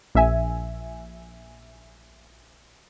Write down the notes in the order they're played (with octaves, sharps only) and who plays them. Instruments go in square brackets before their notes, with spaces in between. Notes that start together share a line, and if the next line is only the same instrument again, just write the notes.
[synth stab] A#1 E5 G#5